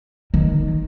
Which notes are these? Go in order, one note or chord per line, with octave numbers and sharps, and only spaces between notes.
D#3